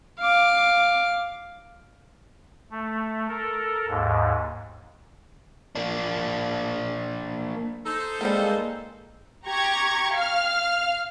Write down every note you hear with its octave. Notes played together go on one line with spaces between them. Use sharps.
F5 D6
A3
A4 A#4
D#2 G#2
A#3 D4
D#4 A4 C5
G3 G#3 A#3 C4 B4
G4 A#5 C#6 G#6
F5 F6